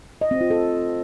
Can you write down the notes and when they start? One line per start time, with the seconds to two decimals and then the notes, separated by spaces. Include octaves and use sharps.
0.21 D#5
0.31 C4
0.41 F4
0.50 A4